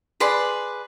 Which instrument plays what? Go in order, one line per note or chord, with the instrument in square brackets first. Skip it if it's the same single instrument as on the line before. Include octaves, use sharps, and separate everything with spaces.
[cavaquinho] G#4 B4 D5 C6